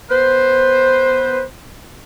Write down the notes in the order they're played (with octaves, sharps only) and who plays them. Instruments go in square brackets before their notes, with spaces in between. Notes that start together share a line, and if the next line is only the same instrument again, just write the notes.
[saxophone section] B3 B4 C5